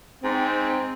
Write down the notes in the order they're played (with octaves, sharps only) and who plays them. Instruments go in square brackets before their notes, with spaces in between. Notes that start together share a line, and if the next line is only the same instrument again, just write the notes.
[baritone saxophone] G#2 [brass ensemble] C4